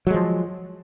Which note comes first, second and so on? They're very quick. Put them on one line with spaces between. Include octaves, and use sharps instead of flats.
F#3 G#3 F3